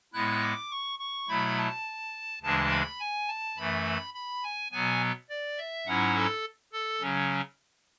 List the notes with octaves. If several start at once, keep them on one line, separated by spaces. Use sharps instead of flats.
A2 G#3 B3 E4 F#6
D6
C#6
C#6
B2 F#3 A3 E4 B5
A5
D2 C#3 E3 G#3 D4 A5
B5
G#5
A5
F#2 E3 A3 B5
B5
G#5
B2 F#3 B3 G#5
D5
E5
G#2 F#3 C#4 E4 F#5
A4
A4
C#3 F#3 C#4